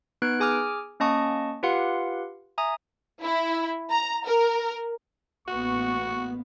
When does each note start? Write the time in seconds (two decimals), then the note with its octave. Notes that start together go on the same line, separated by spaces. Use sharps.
0.22 B3 D#4 B4 F#6 G#6 D7
0.40 G#4 G#5 D6 F6
1.00 A#3 C#4 D#5 A5 C#6 D#6
1.63 F4 G4 B4 F5 F#5 C6
2.58 E5 G#5 A#5 D#6
3.23 E4
3.91 A#5
4.27 A#4
5.48 A1 A#3 B3 F#4 C#6